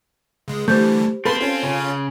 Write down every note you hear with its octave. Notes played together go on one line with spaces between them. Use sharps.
C#2 G#3
D3 E3 G3 A3 G4 C5 G6
A#3 C4 A4 B4 C6
C#4 F4 A4
C#3